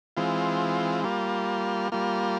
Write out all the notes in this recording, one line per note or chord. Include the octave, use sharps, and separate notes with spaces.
E3 G#3 C4 F4
G3 A#3 F4
G3 A#3 F4